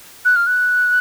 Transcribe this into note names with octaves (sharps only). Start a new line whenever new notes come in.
F#6
F6
F#6